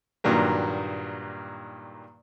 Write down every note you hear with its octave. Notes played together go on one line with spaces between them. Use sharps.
G2 A#2 D#3 F#3 A#3